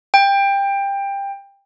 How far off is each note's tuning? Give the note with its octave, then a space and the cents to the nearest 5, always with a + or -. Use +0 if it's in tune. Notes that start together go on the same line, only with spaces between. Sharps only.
G5 +20